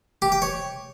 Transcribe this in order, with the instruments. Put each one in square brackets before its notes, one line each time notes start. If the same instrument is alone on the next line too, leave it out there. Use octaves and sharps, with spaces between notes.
[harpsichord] G4
G5
C#5